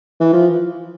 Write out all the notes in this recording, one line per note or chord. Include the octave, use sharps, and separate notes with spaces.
E3
F3